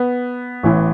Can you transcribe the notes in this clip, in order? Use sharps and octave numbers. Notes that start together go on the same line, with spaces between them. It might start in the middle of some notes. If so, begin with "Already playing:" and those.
Already playing: B3
A1 A2 E3